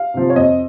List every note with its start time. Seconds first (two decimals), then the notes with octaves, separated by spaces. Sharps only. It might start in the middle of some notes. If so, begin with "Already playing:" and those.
Already playing: F5
0.14 C3 F3
0.30 C#5
0.36 F2 D#5